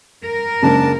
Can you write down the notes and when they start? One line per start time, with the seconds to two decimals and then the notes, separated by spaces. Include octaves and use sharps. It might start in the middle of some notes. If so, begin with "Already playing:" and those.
0.25 A#4
0.63 F#1 C#2 D4 A5